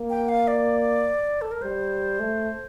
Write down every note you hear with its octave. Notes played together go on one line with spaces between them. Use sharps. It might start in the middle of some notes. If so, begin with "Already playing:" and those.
Already playing: A#3
G5
F5
D5
A4
A#4
G3 C5
A3